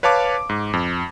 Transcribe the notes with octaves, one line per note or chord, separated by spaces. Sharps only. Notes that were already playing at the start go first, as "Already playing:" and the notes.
B4 C#5 F5 A5 D6
G#2
F2